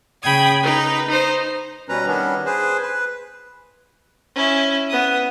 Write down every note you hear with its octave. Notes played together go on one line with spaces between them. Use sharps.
C#3 G5 B5 D#6 G#6
D#4 B4
D#4 C5
B2 G3 C#4 B4 A#5
D#3 G3 B3 C#4 D4
G#4 B4 C5
B4
C#4 E4
B3 D#6